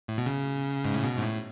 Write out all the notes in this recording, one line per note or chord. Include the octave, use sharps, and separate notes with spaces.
A2
B2
C#3
G#2
A2
B2
G#2
A2